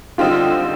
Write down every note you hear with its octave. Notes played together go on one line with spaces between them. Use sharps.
D3 G3 C4 D#4 F4 G4